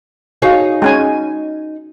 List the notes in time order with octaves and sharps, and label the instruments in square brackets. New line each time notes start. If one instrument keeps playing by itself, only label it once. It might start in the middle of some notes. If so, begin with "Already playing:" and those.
[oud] D#4 G#4 C#5 [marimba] F#4 F5
[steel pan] G#3 C#4 G#5